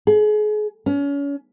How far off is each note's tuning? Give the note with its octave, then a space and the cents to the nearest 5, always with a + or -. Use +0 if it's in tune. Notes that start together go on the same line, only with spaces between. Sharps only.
G#4 +35
C#4 +35